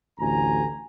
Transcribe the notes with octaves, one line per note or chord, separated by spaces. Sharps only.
A1 D2 G#5 A#5